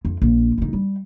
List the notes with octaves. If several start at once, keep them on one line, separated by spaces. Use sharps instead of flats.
F2
A#1
D2 D#4
G3